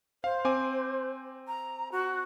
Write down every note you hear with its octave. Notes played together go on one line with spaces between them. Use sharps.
C5 F5
C4 G#5 D6
A#5
F#4